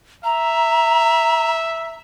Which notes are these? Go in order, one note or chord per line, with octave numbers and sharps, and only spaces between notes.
E5 A#5